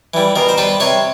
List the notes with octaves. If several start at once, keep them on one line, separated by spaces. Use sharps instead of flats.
E3 G3
B2 A#4
C5
G3 B4
C3 C#5